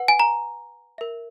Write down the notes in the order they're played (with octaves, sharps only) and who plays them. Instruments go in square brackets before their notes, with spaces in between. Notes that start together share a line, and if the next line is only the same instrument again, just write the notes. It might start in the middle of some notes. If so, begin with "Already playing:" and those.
Already playing: [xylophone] B4 F#5
G#5
A#5
A#4 E5